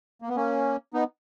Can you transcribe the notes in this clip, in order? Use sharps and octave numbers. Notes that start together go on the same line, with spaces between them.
A#3
B3
A#3 C#4
B3 D#4